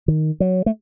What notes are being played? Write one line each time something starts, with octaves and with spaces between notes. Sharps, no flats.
D#3
F#3
A3